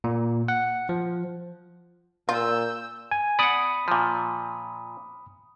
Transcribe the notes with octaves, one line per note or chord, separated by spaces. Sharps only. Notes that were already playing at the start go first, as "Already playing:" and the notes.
A#2
F#5
F3
A#2 F4 E6 G6
G#5
D5 F#5 B5 D#6
A#2 F3